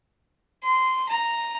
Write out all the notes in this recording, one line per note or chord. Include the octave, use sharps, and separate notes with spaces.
C6
A#5